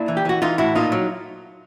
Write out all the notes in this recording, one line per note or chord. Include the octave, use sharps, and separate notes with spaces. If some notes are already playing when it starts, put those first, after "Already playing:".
Already playing: A#2 D4 E4
E3
G4
E3 F#4
E3 D#4 F4
A2 E4 F#4
A#2 D#4 F4
F#3